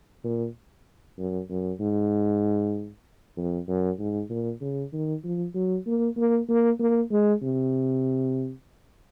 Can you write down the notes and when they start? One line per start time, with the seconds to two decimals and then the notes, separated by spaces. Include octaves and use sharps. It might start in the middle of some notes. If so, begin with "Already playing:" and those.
0.24 A#2
1.18 F#2
1.50 F#2
1.80 G#2
3.37 F2
3.68 F#2
3.99 G#2
4.30 A#2
4.61 C#3
4.93 D#3
5.24 F3
5.55 F#3
5.87 A#3
6.17 A#3
6.49 A#3
6.80 A#3
7.11 G#3
7.42 C3